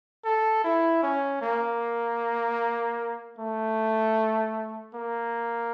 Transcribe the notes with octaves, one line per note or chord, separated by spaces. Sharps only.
A4
E4
C#4
A#3
A3
A#3